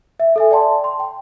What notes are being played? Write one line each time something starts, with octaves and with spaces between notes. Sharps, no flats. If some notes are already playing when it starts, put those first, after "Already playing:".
E5
A4 E5 G#5
D5 G5 A5 C6
C6
G5